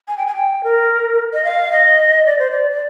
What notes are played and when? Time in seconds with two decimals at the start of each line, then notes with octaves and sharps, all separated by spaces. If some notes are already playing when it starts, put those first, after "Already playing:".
0.08 G#5
0.18 G5
0.26 G#5
0.35 G5
0.64 A#4
1.33 D#5
1.44 F5
1.72 D#5
2.26 D5
2.39 C5
2.51 D5
2.71 D5